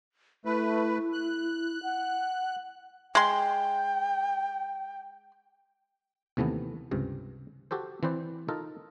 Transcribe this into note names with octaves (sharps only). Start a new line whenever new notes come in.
A3 E4 B4
F#6
F#5
G#3 G5 C6
D#2 C3 E3 A3 B3
C#2 G2 C3
F#4 G4 A4 C5
E3 C4 B4 C5 D5
D#4 F4 A4 A#4